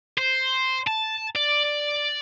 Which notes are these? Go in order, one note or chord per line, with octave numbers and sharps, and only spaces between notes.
C5
A5
D5